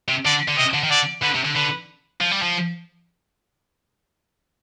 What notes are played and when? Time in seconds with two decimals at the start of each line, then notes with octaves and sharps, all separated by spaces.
0.08 C3
0.25 D3 D5
0.48 D3
0.57 C3 D#5
0.74 D3
0.83 D#3
0.90 D3 D5
1.22 D3 B4
1.34 C3
1.45 D3
1.55 D3 B4
2.21 F3
2.31 G3
2.42 F3